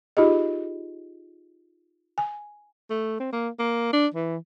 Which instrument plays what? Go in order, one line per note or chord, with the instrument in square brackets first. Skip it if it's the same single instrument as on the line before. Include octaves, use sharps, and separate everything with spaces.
[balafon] D#4 F4 G4 G#4 D#5
G#5
[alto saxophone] A3
C4
A#3
A#3
D4
E3